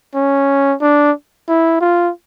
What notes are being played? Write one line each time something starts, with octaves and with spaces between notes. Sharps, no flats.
C#4
D4
E4
F4